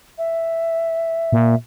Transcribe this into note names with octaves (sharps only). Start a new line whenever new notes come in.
E5
A#2